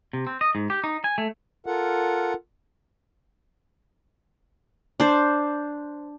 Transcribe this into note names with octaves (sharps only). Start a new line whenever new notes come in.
C3
C4
D#5
G#2
G4
D#4
G#5
A3
F4 A4 A#4 F#5
D4 C5